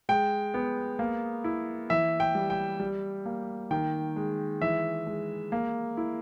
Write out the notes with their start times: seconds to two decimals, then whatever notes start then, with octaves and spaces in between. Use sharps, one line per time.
0.09 G#3 G5
0.54 B3
0.99 A#3
1.44 E4
1.90 E3 E5
2.20 G5
2.35 G3
2.50 G5
2.80 G3
3.26 A#3
3.71 D#3 G5
4.16 G#3
4.62 E3 E5
5.07 G#3
5.52 A#3
5.97 E4